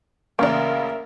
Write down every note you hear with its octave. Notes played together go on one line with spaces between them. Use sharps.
A1 C#3 A#3 A#4 D5 E5 F5